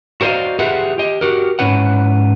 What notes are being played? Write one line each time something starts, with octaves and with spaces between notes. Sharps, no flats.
F#4 A#4 C5 D5 D#5 F5
F4 G4 G#4 B4 E5 F#5
G4 D#5
F#4 G4 A#4
G#2 C#4 E4 B4 F#5